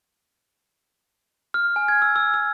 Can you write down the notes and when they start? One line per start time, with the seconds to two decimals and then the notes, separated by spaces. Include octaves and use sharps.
1.54 F6
1.76 G#5
1.88 G#6
2.02 E6
2.16 E6
2.34 E6